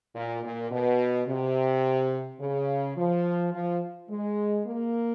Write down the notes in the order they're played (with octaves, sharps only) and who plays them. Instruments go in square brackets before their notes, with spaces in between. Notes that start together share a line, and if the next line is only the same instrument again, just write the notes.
[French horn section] A#2
A#2
B2
C3
C#3
F3
F3
G#3
A#3